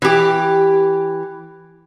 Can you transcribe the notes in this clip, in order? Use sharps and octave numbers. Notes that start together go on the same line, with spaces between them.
E3 G4